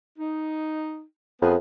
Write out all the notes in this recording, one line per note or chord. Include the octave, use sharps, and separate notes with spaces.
D#4
F2 B3 G#4